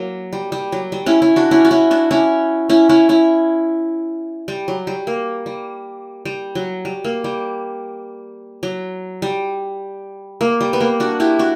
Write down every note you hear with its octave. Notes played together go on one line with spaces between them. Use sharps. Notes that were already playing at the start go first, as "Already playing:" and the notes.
Already playing: F#3 A#3
G3
G3
F#3
G3
C#4 E4
C#4 E4
D4 F#4
C#4 E4
F#4
C#4 E4
D4 F#4
C#4 E4
C#4 E4
C#4 E4
C#4 E4
G3
F#3
G3
A#3
G3
G3
F#3
G3
A#3
G3
F#3
G3
A#3
G3
B3
A#3
D4 F#4
E4 G4
D4 F#4